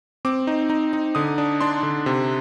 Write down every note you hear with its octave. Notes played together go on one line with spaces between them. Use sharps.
C4 D6
D#4
D#4
D#4
D3 D#6
D4
D4 C6
D3
C3